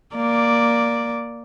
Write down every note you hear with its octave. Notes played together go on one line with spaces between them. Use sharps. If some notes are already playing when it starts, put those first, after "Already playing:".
A#3 D5